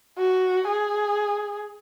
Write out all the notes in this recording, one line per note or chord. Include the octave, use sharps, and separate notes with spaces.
F#4
G#4